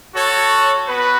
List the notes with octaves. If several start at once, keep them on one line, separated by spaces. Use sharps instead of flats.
F#4 A4 C#5
B3 F#4 B4